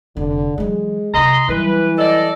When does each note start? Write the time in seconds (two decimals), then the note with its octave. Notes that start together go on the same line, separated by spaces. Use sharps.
0.17 F1 D3
0.58 E3 F#3 G#3
1.14 C3 E4 D#5 A#5 C6
1.49 E3 F#3 G3 B4
1.98 A4 D5 D#5